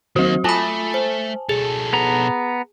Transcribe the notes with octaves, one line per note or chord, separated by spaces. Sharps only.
D#3 F#3 A#3 F#4
A3 F4 G#5 A5 B5
C5
B2 G#4 A4
B3 A#5